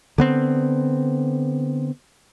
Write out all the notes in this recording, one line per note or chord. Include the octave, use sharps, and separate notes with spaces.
D3 B3 C4